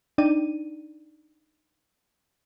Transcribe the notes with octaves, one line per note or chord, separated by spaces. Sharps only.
D4 D#4 D5 G5 D#7